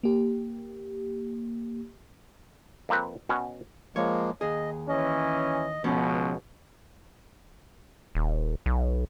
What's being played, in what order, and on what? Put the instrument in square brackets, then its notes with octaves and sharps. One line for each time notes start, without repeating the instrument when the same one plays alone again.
[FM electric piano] A#3 G4
[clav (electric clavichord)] F2 A#3 C4 B4
B2 C#4 F#5
[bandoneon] F3 G#3 A#3 [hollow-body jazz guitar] C#5
[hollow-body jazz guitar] D#2 G#4 [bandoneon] D#5
[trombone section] E3 C#4 [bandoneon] D#5
[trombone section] C#2 B2 [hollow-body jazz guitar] F3 B3 C#4
[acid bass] D#1
B1